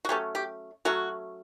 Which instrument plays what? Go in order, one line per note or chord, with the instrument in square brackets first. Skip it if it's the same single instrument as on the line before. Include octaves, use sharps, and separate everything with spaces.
[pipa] F#4
F#3 A3 C#4 G4
G4
F#3 A3 C#4 F#4